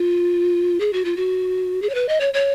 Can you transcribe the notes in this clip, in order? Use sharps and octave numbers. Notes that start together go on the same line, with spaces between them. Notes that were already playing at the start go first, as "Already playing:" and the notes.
Already playing: F4
G#4
F#4
F4
F#4
G#4
C#5
B4
D#5
C#5
C#5